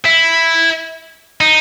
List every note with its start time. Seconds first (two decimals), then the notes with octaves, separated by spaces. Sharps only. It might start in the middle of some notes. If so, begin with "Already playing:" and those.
0.05 E4
1.41 D#4